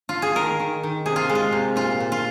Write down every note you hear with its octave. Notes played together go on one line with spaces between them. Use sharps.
F4
G#4
D#3 A#4
D#3
D#3
C3 G#4
F4
G#3
F4
C3
A#2 F4
A#2
F4